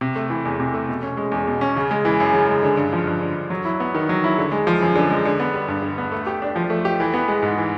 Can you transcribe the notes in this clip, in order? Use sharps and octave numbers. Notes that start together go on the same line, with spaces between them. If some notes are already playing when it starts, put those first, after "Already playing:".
C3
A3
E3
E2
C3
A3
B2
C#4
G#3
E2
B2
C#4
C#3
G#3
E3
F#2
C#3
G#3
D3
G2
F3
G2
D3
G2
F#3
E4
B3
D#3
F#3
E4
D3
G#3
F3
F#2
D3
G#3
D3
B3
G3
G2
D3
B3
A3
G4
D4
F3
A3
G4
E3
B3
G#3
G#2
E3